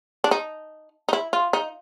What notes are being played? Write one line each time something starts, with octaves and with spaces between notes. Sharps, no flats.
D4
D#4
D#4
E4
F4
D#4